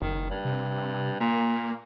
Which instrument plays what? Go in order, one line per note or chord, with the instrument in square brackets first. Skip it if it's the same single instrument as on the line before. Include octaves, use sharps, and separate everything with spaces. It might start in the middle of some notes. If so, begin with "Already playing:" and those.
[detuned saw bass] F#1 [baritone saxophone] D#3
[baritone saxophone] G2
[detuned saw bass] C3
[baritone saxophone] A#2 [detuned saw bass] A#3